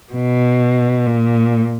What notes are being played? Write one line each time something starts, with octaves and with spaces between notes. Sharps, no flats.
B2
A#2